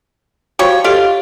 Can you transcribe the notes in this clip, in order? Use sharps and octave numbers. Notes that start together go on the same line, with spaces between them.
F3 G3 F#4 C#5
F4 G4 A4 D#5